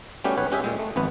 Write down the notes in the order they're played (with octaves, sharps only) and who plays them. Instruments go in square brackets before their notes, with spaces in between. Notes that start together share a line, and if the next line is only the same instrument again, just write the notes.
[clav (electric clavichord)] G3 A3 B3 C#4 F#4 G4
B1 B4 C#5 F#5
G#3 C#4 G4 G#4 E5
A#2 G#3
A3
G#1 F2 B3 B4